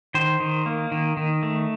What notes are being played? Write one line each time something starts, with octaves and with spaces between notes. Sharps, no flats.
D#3 C5
D#3
A#3
D#3
D#3
A3